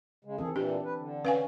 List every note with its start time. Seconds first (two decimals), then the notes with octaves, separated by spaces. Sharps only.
0.25 C#3 G#3
0.38 D#3 E3 C4 G#4 A4
0.56 A#2 E3 D4 G4
0.84 B4
0.98 D3
1.25 C#4 B4 F5 G#5